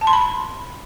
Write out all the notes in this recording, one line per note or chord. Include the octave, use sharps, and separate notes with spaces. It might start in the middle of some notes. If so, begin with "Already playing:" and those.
A5
C6
B5